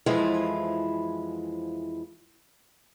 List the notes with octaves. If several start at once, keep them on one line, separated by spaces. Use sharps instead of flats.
F2 E3 F3 G#3 E4